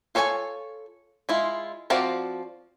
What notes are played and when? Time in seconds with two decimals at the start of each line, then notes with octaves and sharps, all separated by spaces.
0.15 F4 A4 C#5 D5 G#5
1.29 G#3 E4 F4
1.90 F3 C4 F#4 D5 F5